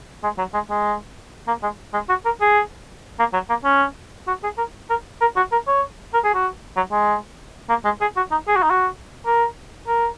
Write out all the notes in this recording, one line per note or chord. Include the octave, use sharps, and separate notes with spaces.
G#3
F#3
G#3
G#3
A#3
G#3
G#3
F#4
A#4
G#4
A#3
F#3
A#3
C#4
F#4
G#4
A#4
A#4
A#4
F#4
A#4
C#5
A#4
G#4
F#4
F#3
G#3
A#3
G#3
G#4
F#4
D#4
G#4
F#4
D#4
F#4
A#4
A#4